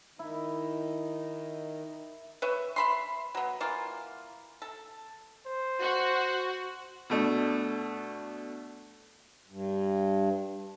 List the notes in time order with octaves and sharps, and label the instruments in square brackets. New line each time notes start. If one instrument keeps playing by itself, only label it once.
[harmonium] D#3 D#4 [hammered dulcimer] E4
[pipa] B4 C#5 E5
E5 B5 C6
F#3 B3
E3 A#3 F4
A4
[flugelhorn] C5
[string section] F#4
[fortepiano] B2 A3 D4
[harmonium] G2